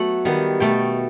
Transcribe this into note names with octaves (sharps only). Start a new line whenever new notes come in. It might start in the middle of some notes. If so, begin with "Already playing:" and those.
Already playing: F#3 A3 B3 F#5
D#3 G3 B3
B2 A3 G5